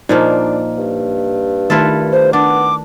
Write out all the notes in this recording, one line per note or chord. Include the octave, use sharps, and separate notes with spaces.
A#2 F3 A#3 D4 D#4
G2
D#3 A3 E4 F4 A4 B4
C5
B3 D4 D6